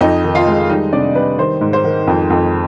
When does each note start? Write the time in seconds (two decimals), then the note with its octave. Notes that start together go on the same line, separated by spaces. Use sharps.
0.01 F2 D#4 D#5
0.24 D#3
0.35 F4 F5
0.47 G#3
0.69 G3 D#4 D#5
0.93 C3 D4 D5
1.15 G3 B4
1.38 D#3 C5
1.61 G#2
1.73 C5
1.84 D#3
2.07 F2
2.30 F2